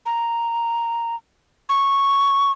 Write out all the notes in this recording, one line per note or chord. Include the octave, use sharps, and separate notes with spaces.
A#5
C#6